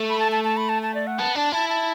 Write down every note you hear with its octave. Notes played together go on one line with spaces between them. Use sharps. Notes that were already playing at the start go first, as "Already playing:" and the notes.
Already playing: A3
B5
A5
A5
A5
B5
A5
A5
D5
F#5
B3 A5
D4 A5
E4 A5
A5